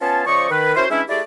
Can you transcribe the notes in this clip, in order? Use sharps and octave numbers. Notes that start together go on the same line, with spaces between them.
B3 C#4 F4 F5 G#5 A5
C#3 F3 C5 D5 D#5 C#6
D#3 B4
C#4 E4 F#4 A#4 C5
E3 G#3 C#4 D4 E4
A3 E4 G4 G#4 D5